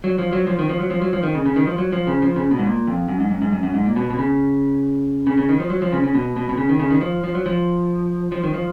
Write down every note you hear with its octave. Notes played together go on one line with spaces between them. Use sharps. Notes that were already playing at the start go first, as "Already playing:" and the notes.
F#3
F3
F#3
F3
D#3
F3
F#3
F3
F#3
F3
D#3
C#3
C#3
D#3
F3
F#3
F3
C#3
F3
C#3
B2
G#2
A#2
F2
F#2
G#2
F#2
G#2
F#2
F#2
G#2
A#2
B2
B2
C#3
C#3
C#3
D#3
F3
F#3
F3
C#3
C#3
B2
B2
B2
C#3
D#3
C#3
D#3
F3
F3
F#3
F3
F3
D#3
F3